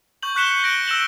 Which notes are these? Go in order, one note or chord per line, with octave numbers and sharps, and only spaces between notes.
C#6 G6 F#7
C#6 F#6 B6 C#7 E7 G7
F#6 A#6 D7 G7
E6 A#6 E7 F#7